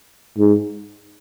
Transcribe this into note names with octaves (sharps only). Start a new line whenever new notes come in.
G#2